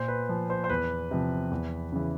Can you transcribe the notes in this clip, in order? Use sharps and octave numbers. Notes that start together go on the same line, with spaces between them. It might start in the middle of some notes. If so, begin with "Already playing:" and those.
Already playing: A#2 C5
B4
F3
C5
C5
E2 B4
C3 F3
E2
C#3 E3